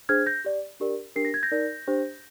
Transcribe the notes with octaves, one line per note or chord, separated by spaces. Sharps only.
D4 G#4 C5 F6 G#6
G6 A#6
G4 D5
D4 G4 A#4 D5
D4 G4 A#4 C7
A#6
G#6
G6 A#6
D#4 A#4 D5
D4 G4 C5